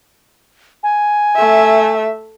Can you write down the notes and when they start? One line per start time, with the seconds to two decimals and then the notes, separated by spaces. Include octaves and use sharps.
0.83 G#5
1.36 A3 E5